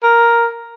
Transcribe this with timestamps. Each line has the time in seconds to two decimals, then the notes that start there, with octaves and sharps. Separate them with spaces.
0.03 A#4